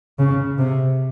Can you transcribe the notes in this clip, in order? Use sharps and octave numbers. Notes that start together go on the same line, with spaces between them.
C#3
C3